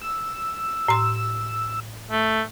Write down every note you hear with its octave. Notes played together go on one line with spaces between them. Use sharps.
E6
A2 C6
A3